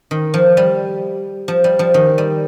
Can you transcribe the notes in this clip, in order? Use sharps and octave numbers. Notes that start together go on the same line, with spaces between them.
D#3
F3
G3
F3
G3
F3
D#3
G3